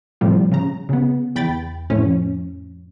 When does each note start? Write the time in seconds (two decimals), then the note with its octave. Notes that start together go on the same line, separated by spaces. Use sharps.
0.21 A2 C3 F3 G3
0.52 C#3 A#5
0.89 C#3 B3
1.36 E2 G5 B5 A6
1.90 F2 A2 F3 C#4